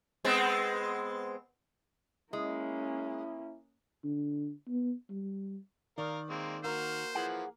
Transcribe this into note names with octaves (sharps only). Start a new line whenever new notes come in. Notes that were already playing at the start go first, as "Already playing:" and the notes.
G#3 B3 C4
G#3 A#3 C#4 E4
D3
B3
G3
D#3 A#4 D5 F5
G#3 A#3 C4
A#3 F#4 C5 A#5 F6
E3 F3 G#4 F#5